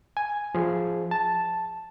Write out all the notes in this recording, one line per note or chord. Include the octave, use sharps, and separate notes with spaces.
G#5
F3 G#4
A5